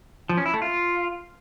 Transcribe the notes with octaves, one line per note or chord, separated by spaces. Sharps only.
F3
C#4
E4
A3
F4